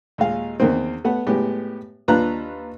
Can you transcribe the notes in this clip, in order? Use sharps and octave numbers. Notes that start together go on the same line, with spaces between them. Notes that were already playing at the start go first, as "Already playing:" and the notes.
D#2 A#2 G#3 F5
E2 D#3 A#3 C4
A3 B3 F#5
A2 G#3 B3 G4
D#2 D4 F4 B4 A#5 F#6